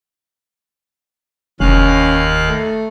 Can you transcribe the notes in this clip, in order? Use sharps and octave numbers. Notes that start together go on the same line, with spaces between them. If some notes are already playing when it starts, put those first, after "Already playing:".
F1 D#2 C#4 F5 F#6
A3